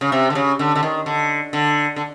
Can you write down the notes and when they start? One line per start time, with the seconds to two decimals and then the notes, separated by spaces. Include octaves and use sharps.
0.01 C#3
0.12 C3
0.30 D3
0.35 C#3
0.59 D3
0.76 D3
0.83 D#3
1.06 D3
1.53 D3
1.96 D3